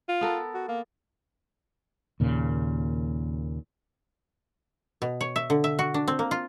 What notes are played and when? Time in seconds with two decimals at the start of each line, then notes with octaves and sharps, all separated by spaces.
0.09 F4
0.21 B3 A4 A#4
0.54 F#4
0.68 A#3
2.20 D#2 A#2 C#3
5.02 B2
5.21 C#5
5.36 E5
5.50 D3
5.64 E5
5.79 F#4
5.94 D4
6.08 C4
6.19 A#3
6.31 F4